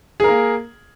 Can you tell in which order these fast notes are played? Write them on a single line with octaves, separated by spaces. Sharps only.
G#4 A#4 A#3